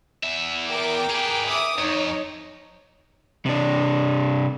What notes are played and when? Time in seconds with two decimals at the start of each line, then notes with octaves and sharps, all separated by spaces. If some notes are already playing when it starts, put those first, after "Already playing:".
0.23 E2 E5
0.70 A#4 G5 D6
1.10 G#4 B4
1.48 E5 D6 D#6
1.78 F2 D#4 C#5
3.46 C3 D4